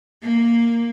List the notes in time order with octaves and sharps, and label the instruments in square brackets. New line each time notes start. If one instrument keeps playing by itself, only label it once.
[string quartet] A#3